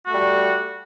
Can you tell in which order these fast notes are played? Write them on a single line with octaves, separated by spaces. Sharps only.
F#4 A3 G3